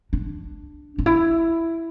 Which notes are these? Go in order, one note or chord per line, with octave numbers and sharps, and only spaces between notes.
D4
D4
E4